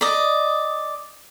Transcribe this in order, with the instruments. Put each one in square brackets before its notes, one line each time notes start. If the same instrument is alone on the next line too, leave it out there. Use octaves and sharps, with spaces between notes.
[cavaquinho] D5 D#5